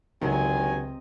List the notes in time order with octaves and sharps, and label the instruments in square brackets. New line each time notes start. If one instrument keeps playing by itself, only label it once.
[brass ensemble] G1 G#5 [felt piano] C#2 [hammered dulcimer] C3 D#5 [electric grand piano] D#3 F#3